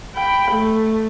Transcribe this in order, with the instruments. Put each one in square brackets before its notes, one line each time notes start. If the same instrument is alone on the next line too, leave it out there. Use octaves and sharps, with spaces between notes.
[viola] G5 B5
A3